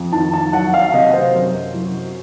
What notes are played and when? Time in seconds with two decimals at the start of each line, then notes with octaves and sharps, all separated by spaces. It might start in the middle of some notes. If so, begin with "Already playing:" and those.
Already playing: F2
0.13 D#3 A5
0.34 A5
0.53 F#3 F#5
0.74 F5
0.93 C3 D#5
1.14 C5
1.35 F#2
1.74 F#3